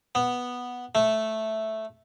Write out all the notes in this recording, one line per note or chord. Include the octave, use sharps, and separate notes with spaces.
B3
A3